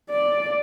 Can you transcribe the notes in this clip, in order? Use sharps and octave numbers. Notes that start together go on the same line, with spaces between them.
D5